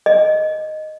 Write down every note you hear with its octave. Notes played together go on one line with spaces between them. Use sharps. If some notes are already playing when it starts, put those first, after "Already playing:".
D#5